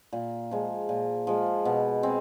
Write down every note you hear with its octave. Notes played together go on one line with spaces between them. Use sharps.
A#2
F3 G#3
A#2
F3 G#3
B2
G#3 C4